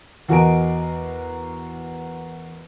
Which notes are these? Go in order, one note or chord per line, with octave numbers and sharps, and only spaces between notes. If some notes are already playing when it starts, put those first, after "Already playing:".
E2 F#4 A#4 D#5 G#5 D7